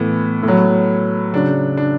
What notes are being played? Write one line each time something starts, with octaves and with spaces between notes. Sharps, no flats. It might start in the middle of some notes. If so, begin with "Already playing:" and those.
Already playing: A2 E3 B3
A2
F#3
C#3 F#3 D4
D4